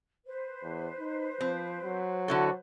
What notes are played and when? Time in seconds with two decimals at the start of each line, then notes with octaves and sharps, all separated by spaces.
0.26 B4 C5
0.63 E2
1.00 D#4
1.41 F3 C4
1.84 F#3
2.28 D3 E4 F#4 A4